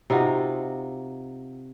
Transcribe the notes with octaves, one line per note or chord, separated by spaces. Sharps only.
C3 D#4 F4 F#4